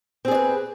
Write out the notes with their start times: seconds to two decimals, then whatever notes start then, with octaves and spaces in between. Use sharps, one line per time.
0.25 C4
0.28 G#4
0.31 D5
0.35 B4